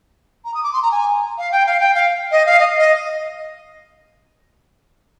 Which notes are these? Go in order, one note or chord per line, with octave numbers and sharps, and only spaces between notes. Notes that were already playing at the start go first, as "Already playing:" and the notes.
A#5
D#6
D6
C6
A#5
G#5
F5
G5
F5
G5
F5
D#5
F5
D#5
D#5